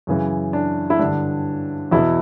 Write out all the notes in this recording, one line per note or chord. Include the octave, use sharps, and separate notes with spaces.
F#2 C#3 E3
D4
E4
G2 D3 D4
E2 B2 E4